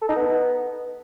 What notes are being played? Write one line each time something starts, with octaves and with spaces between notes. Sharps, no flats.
A4
D#4
B3